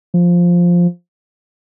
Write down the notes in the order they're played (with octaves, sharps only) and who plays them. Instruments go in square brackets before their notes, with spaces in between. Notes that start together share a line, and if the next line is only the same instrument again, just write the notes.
[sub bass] F3